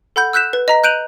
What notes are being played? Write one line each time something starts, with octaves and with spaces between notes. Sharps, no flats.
A4 F#5 B5 G6
E6 F#6 G6 B6 E7
B4
D#5 A#5 B6
F#6 G6 D7 D#7 F7 F#7